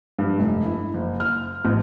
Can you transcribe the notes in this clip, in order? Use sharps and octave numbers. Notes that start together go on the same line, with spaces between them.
G2
F1
E4
F#1
F6
A1